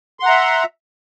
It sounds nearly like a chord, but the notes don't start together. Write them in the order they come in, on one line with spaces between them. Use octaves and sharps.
C6 F#5 A#5 E5